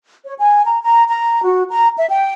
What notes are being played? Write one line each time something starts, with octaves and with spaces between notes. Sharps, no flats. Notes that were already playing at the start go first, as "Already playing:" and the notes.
C#5
G#5
A#5
A#5
A#5
F#4
A#5
E5
G5